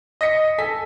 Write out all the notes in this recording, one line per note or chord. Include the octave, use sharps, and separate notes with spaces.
D#5 A#6 B6 C#7
A4 G#5 B6